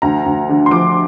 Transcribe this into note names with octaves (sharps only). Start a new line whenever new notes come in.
D2 A#5
D2
D3
C6
F3 D6